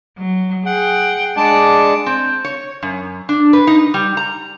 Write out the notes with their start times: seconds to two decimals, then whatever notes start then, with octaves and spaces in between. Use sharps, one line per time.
0.19 F#3
0.66 G#4 F#5 G5
1.37 G#3 D4 D5 F#5 A5
2.06 C4
2.44 C#5
2.83 F#2
3.29 D4
3.53 B4
3.67 D#4
3.94 G3
4.17 A#5